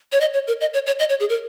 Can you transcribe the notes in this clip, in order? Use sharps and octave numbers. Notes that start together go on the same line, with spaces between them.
C#5
D#5
C#5
A#4
D#5
C#5
C#5
D#5
C#5
G#4
A#4